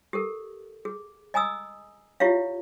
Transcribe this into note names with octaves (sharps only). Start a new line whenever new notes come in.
G4 A4 A#4
G#4
D#5 G#5 A#5 D#6 E6
E4 F4 G4 C#5 E5 F5